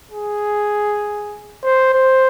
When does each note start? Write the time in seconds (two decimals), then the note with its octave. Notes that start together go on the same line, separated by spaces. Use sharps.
0.12 G#4
1.63 C5
1.94 C5